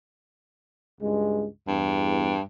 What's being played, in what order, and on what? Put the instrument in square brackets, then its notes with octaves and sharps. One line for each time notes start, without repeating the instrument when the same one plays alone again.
[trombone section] C#2 G2 G#3
[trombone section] E2 [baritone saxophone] G2